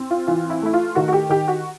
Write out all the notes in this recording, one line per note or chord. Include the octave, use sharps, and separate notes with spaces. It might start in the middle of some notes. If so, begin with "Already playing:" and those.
Already playing: C4
F4
E3 F4
E4
A3 E4
F4
D#3 F#4
F#4
G4
D#3 G4
F#4